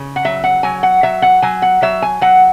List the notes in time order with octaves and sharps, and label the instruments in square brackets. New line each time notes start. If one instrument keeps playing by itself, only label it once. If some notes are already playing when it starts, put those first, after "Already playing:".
Already playing: [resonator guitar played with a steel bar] C#3
F#5
F#3 E5
F#5
F#3 G#5
F#5
F#3 E5
F#5
F#3 G#5
F#5
F#3 E5
G#5
F#3 F#5